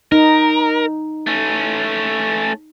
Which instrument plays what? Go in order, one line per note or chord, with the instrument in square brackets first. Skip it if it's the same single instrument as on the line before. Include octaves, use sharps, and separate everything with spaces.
[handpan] D#4 [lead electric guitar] A#4
[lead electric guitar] A3 C#4